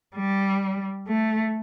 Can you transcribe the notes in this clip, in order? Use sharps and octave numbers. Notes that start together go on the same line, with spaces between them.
G3
A3